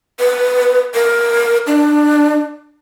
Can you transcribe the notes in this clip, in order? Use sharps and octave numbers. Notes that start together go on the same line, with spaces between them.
B4
A#4
D4